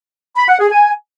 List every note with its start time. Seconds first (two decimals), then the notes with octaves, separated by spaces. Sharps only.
0.37 B5
0.48 F#5
0.60 G#4
0.71 G#5